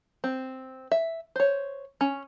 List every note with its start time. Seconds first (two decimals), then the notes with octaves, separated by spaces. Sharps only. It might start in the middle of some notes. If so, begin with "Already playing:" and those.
0.24 C4
0.92 E5
1.36 C5 C#5
2.01 C#4